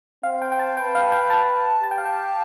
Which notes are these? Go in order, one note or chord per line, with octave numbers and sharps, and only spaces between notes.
C4 F5
G5
G5
A5
B4 G5
F5
G5
A5
G4 A5
G5
F5
G5